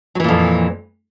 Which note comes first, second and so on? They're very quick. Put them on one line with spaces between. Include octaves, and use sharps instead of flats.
F#3 E3 A#2 F2